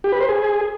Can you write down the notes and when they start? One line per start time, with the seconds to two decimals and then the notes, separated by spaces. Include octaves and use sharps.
0.04 G4
0.12 B4
0.21 C5
0.29 G#4